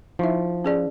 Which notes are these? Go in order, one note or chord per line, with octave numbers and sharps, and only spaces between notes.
F3 D#4 E4 E5
C#4 G#4 D5